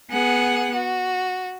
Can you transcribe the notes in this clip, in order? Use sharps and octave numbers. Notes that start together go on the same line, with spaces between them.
B3 G#4 F#5
F#4